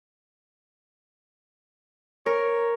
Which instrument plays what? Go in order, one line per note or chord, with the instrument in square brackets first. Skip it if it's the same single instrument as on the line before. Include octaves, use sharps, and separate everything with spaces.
[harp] A#4 [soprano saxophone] C#5